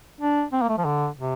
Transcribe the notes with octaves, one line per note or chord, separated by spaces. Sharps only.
D4
C4
A#3
A3
F3
D3
C3